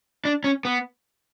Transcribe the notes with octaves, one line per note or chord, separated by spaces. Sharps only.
D4
C#4
B3